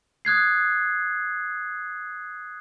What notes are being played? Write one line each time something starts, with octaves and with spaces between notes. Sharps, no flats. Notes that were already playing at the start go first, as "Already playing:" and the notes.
D#6 F#6 G#6 C7